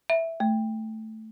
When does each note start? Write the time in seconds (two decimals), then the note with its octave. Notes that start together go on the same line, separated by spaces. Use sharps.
0.10 E5
0.40 A3